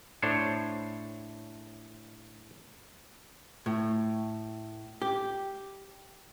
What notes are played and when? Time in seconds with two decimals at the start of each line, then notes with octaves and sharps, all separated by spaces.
0.22 A2 D4 C5 C#5
3.66 A2
5.02 G4